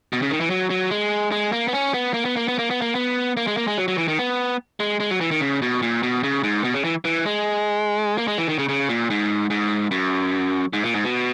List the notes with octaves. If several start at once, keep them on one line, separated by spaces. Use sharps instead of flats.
B2
C#3
D#3
E3
F#3
F#3
G#3
G#3
A#3
B3
C#4
B3
A#3
B3
A#3
B3
A#3
B3
A#3
B3
A#3
G#3
A#3
G#3
F#3
F#3
E3
D#3
B3
G#3
G#3
F#3
E3
D#3
C#3
B2
A#2
B2
C#3
G#2
B2
C#3
E3
E3
G#3
A#3
G#3
E3
D#3
C#3
C#3
A#2
G#2
G#2
F#2
G#2
A#2
G#2
B2